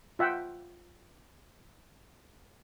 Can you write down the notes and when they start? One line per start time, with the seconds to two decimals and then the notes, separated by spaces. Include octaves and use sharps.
0.19 F4 E5 F#5 G5